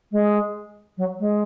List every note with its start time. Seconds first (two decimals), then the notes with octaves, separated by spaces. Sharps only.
0.12 G#3
0.97 F#3
1.20 G#3